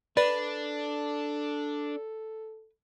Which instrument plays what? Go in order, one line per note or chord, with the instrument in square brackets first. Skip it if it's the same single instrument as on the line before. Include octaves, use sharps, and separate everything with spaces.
[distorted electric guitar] D4 [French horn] A4 [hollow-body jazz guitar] B4 [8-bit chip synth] D5